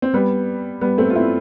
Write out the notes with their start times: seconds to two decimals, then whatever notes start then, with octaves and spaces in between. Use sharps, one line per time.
0.02 C4
0.14 G3 B3
0.81 G3 B3
0.98 A3 C4
1.10 F4
1.15 C4 E4